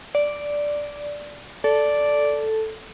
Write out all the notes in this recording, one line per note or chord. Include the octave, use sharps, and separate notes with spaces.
D5
A4 D5